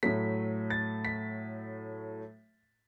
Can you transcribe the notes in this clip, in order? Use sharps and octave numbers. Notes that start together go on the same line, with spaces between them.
A2 F#3 A3 B6
A6
B6